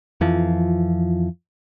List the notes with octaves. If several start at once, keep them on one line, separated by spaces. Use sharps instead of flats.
F2 E3 F3